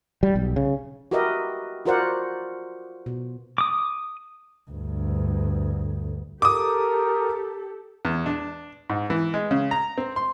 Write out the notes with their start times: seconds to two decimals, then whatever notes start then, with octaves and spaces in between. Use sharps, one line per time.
0.23 G3
0.35 B1
0.56 C#3
1.11 F#4 G4 A#4 B4 D#5 E5
1.86 F4 F#4 A#4 C5 D5 F#5
3.06 B2
3.58 D6 D#6
4.71 D2 G2
6.42 G4 A4 A#4 D6 D#6
8.05 E2
8.26 D4
8.90 G#2
9.10 E3
9.34 G#3
9.51 C#3
9.71 A#5
9.98 C4
10.16 C6